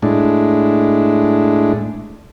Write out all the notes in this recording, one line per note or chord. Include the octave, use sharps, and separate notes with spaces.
A2 G#3 D4